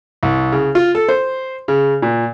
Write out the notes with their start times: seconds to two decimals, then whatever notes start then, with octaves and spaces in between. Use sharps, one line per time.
0.23 C2
0.52 C#3
0.75 F4
0.95 A4
1.09 C5
1.68 C#3
2.02 A#2